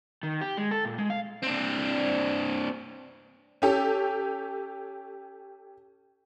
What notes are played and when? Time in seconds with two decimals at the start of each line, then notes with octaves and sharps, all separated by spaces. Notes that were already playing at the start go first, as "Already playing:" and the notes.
0.23 D#3
0.41 G4
0.57 G#3
0.71 A4
0.85 A#2
0.98 G#3
1.10 F5
1.43 C4 D4
3.62 C#4 G4 A4